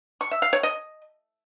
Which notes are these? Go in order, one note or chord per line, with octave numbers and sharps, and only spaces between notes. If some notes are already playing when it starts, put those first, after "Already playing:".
C#6
E5
F5
C#5
D#5